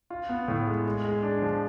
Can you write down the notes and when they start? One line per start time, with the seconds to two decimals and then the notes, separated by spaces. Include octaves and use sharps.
0.10 F4
0.29 B3
0.48 A2
0.67 G#3
0.86 G#3
1.04 G#3
1.23 D4
1.42 F3